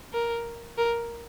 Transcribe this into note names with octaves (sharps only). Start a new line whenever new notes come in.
A#4
A#4